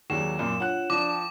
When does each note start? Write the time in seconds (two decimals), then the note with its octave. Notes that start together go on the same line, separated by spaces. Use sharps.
0.10 D#2 F#3 G#4 D5 C#6 E7
0.39 F#2 A#2 F5 D#6
0.60 D4 F4 C#5 F#5 F#6
0.90 F3 D4 D5 A5 D6
1.12 G5